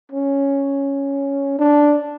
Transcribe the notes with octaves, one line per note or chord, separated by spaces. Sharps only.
C#4
D4